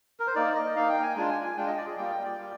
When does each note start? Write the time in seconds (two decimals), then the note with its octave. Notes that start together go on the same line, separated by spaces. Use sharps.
0.20 A#4
0.27 C5
0.35 A#3 D#4 D5
0.55 D#5
0.76 A#3 D#4 F5
0.89 G5
1.03 G#5
1.16 G#3 D4 F4 G#5
1.30 G#5
1.44 G#5
1.57 G#3 D4 F4 G5
1.67 D#5
1.77 D5
1.87 G#4
1.97 G3 A#3 F4 G5
2.11 G5
2.25 D5
2.38 G3 A#3 F4